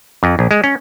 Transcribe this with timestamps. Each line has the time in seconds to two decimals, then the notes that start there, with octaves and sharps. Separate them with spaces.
0.23 F2
0.39 A#1
0.51 G#3
0.64 C#4